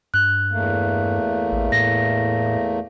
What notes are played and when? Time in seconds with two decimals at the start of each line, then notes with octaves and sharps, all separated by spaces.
0.14 G2 F#6
0.51 E2 A3 A#3
1.52 A1
1.72 A2 A#6